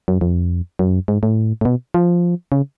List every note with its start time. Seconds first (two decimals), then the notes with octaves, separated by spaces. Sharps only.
0.08 F#2
0.21 F2
0.79 F#2
1.08 G#2
1.23 A2
1.61 A2
1.65 B2
1.94 F3
2.52 C#3